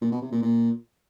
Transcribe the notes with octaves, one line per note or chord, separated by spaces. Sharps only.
A#2
B2
C3
A#2
A#2